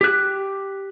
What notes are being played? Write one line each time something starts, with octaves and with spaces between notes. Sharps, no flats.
G4 F#6